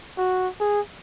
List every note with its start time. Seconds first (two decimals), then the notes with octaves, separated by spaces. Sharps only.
0.18 F#4
0.60 G#4